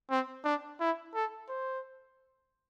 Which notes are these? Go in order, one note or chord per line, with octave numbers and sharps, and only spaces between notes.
C4
D4
E4
A4
C5